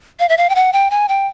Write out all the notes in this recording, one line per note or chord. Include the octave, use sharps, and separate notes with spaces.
F5
E5
F5
G5
F#5
G5
G#5
G5